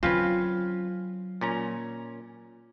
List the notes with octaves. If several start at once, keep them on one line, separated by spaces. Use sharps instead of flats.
D3 F#3 C4 C#4 F4 B4
A#2 C#4 A#5